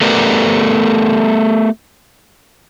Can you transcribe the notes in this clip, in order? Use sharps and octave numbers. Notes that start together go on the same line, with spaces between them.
A3 B3 G4 A#4 B4 D5